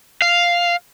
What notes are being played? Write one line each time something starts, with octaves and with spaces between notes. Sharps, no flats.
F5